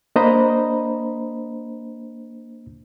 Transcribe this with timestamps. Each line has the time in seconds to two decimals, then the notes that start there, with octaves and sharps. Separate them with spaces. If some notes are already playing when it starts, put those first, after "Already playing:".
0.16 A#3 D4 C5 D#5 A#5 B5